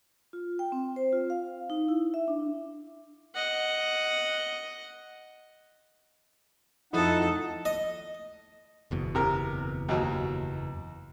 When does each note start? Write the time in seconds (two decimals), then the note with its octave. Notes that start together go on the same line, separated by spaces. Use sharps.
0.33 F4
0.59 G5
0.72 C4
0.96 C5
1.12 F4
1.30 F5
1.70 D#4
1.88 E4
2.14 E5
2.28 D4
3.35 D#5 F#5
6.93 F2 F3 D#4 E4 A4 D#5 F#5
7.65 D#5
8.91 F#1 E2 B2
9.15 C3 A#4
9.89 D#2 F#3